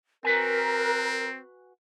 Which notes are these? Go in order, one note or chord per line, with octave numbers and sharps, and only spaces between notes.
C4 F#4 A#4 B4 G#5